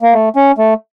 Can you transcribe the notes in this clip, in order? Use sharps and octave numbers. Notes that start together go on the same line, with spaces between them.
A#3
A3
C#4
A3